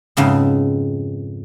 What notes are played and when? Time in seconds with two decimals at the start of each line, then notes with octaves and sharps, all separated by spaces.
0.17 F2 G#2 C#3 B3